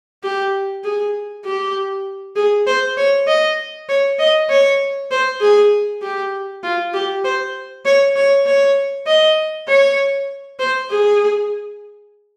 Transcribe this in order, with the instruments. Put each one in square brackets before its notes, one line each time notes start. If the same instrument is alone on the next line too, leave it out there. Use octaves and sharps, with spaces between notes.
[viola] G4
G#4
G4
G#4
C5
C#5
D#5
C#5
D#5
C#5
C5
G#4
G4
F4
G4
C5
C#5
C#5
C#5
D#5
C#5
C5
G#4